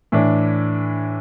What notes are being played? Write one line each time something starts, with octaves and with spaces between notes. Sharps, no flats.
A2 E3 D4